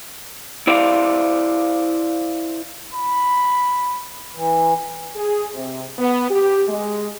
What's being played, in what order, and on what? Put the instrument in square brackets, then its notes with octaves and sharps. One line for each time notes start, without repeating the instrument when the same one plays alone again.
[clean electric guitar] E4 C5 D5 F5
[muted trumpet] B5
[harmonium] E3
[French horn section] G#4
C3
B3
G4
G#3